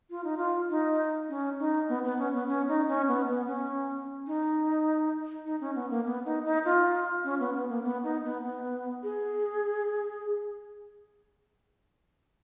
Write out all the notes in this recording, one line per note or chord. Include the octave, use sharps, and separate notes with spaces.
F4
D#4
F4
D#4
C#4
D#4
B3
B3
C#4
B3
C#4
D#4
C#4
B3
B3
C#4
D#4
D#4
C#4
B3
A#3
B3
D#4
D#4
F4
C#4
B3
B3
A#3
B3
D#4
B3
B3
G#4